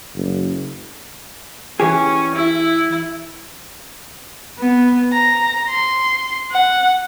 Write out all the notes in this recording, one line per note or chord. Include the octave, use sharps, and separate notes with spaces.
F#1
E3 C#4 G4 G#4
E4
B3
A#5
C6
F#5